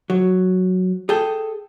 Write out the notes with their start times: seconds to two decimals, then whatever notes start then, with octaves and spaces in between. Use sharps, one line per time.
0.10 F#3
1.09 G#4 A4 G5